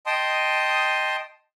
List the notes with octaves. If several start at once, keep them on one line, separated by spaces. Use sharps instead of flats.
D#5 G5 A5 C6 D#6